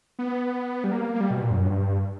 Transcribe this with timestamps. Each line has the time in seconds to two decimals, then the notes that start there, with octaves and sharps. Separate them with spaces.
0.19 B3
0.84 G3
0.91 A#3
1.14 A#3
1.21 G3
1.31 B2
1.41 A#2
1.51 F#2
1.65 G2